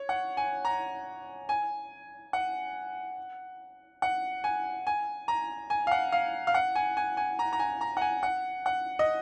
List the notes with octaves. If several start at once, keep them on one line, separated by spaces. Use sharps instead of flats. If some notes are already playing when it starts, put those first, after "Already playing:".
Already playing: C#5
F#5
G#5
A#5
G#5
F#5
F#5
G#5
G#5
A#5
G#5
F5
F#5
F5
F5
F#5
G#5
G#5
G#5
A#5
A#5
G#5
A#5
F#5
G#5
F#5
F#5
D#5